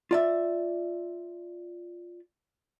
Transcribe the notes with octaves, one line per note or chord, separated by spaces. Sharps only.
F4 D5 E5